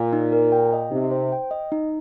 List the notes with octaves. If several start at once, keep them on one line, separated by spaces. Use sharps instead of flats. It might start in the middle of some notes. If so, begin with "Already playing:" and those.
Already playing: A#2
D#4
A#4
G5
D#5
C3 D#4
C5
G5
D#5
D#4